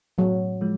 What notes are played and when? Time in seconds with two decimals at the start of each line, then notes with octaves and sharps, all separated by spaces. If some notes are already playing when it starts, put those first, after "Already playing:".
0.18 A2 F#3
0.61 F3 G#3